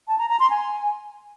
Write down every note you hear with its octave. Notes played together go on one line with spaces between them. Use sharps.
A5
A#5
A#5
C6
G#5